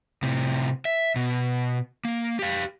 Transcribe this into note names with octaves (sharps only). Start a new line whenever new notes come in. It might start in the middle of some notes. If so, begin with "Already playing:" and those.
A2 C3
E5
B2
A#3
G4 F5